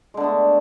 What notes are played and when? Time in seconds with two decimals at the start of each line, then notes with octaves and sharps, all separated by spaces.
0.14 G#3
0.17 D3
0.20 B3
0.24 A3